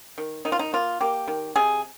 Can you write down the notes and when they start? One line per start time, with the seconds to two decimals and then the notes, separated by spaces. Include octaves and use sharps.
0.18 D#3
0.45 D#3 D#4
0.52 F4
0.59 D#4
0.73 A#3 F4
1.01 A#3 G4
1.27 D#3
1.56 C3 G#4